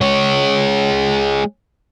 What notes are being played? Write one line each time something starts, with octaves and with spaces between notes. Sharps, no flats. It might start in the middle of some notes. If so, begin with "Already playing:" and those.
G#3 C#5